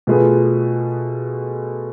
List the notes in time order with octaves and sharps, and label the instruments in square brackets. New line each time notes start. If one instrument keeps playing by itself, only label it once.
[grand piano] B2 A3 F4 G#4 B4